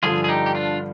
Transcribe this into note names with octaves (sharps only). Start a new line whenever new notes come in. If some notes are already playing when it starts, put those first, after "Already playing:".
G2 D3 F3 F4 G#4
G#4
D#4 G4
G4
D4 F4